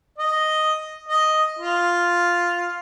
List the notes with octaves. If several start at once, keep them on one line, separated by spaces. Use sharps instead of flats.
D#5
D#5
F4